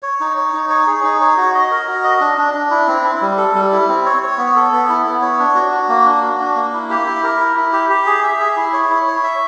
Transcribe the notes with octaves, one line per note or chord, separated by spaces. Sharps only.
C#5
D#4
C#5
D#4
C#5
G#4
D#4
C#5
F#4
D#5
A#4
F#4
D#5
D4
D4
D4
E4
C4
E4
G3
A4
G3
E4
C4
C#5
C#5
B3
A4
B3
E4
B3
C#5
D4
F#4
F#4
A#3
D4
F#4
D4
A#3
E4
G4
E4
A#4
E4
E4
G4
G4
G#4
E5
G#4
E4
C#5
E4
C#5
E5